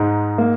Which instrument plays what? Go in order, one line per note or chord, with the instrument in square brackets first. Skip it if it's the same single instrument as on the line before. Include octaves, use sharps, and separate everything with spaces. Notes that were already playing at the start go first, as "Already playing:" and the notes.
Already playing: [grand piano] G#2 G#3 D#4
[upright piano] A#3